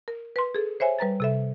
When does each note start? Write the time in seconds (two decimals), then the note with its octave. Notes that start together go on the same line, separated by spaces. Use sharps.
0.08 A#4
0.36 B4 C6
0.55 G#4 A4
0.80 C5 C#5 E5 G#5
0.99 G3 B4 A#5 A6
1.20 C3 A4 E5